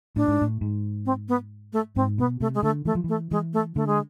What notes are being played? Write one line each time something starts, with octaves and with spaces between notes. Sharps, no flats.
A2 D4
G#2
A2
G#2
C4
B3
A3
G#2 C4
B2 B3
C3 A3
G#3
D3 A3
E3 A3
F3
E3 A3
E3 G#3
A3
D3 A3
G#3